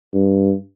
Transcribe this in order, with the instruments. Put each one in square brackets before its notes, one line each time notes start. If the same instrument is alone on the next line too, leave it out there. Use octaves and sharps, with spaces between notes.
[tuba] G2